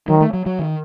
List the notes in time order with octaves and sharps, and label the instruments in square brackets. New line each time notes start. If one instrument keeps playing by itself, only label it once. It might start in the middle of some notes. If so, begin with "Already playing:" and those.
[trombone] D#3 [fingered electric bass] F#3
[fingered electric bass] A3
F#3
F#3
D#3